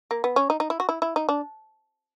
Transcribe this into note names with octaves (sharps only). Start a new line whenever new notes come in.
A#3
B3
C#4
D#4
D#4
E4
F#4
E4
E4
D#4
D4